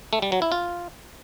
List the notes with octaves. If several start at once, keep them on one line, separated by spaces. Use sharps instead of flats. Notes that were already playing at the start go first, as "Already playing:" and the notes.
A3
G3
F#3
E4
F4